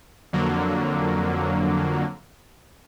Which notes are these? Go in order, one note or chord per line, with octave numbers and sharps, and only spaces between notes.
F2 D3 F#3 A#3